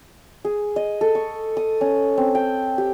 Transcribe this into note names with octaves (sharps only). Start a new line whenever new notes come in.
G#4
D#5
A4
C#6
D#6
C#4
C4
G5
G4